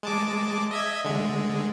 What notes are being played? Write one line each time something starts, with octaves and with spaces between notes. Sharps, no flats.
G#3 A5 D6
D#5 E5 G#6
D3 G#3